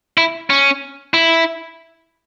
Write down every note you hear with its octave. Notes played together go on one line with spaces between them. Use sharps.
E4
C#4
E4